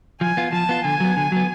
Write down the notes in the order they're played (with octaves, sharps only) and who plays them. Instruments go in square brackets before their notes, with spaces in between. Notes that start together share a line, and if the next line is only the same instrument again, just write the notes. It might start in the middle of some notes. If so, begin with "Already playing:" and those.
[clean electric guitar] F3 [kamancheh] G#5
[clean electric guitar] B3 F4
[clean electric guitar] F3 [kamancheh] A5
[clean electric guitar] B3 F4
[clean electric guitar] D3 [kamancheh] G#5
[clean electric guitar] F#3 B3
D3
F#3 B3